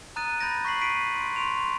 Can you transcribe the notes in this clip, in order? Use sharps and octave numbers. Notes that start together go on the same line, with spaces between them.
A#5 D#6 F#6 A6 D#7
B5 G6 A6 A#6 D7
C#6 B6 C7 F#7
B6 C7 D7 D#7
C6
C6 C#6 D7 F7